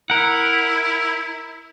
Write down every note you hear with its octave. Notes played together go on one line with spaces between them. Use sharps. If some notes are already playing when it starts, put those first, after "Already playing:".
E4 A#4 F#5